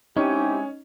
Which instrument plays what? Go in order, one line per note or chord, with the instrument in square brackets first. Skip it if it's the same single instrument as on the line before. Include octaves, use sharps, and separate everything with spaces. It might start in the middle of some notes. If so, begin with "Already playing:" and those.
[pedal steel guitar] G#3 C#5 G#5 [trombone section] C4 E4 G4 [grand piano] C#4 [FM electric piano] D#4